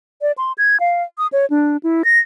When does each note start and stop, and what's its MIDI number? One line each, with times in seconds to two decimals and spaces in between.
0.22 0.32 74
0.38 0.53 84
0.58 0.80 92
0.80 1.03 77
1.18 1.27 87
1.32 1.46 73
1.50 1.77 62
1.83 2.02 64
2.04 2.19 94